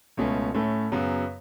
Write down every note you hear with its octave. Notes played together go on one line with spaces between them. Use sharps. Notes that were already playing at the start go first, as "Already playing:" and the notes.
C#2 B2 A3 C#4
A2 A3 C#4
F#2 C#3 F#3 B3